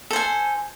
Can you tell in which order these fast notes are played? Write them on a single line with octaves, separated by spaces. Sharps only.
A4 C5 G#5